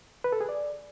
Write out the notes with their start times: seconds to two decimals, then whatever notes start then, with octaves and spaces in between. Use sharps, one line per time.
0.24 B4
0.32 A4
0.41 G#4
0.49 D5